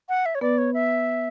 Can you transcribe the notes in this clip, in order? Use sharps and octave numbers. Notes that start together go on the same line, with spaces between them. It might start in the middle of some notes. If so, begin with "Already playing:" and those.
F#5
E5
C#5
B3 B4 D5
C#5
E5